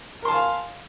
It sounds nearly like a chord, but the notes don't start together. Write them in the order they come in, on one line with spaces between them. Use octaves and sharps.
A#4 C6 A5 G#5 F5